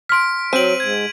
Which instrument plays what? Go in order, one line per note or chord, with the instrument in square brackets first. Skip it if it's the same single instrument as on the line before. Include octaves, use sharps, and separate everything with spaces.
[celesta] C6 F6 [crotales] B6 D7
[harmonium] F#3 [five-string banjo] C4 [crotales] D#7 F#7
[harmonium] G#2 [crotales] G#6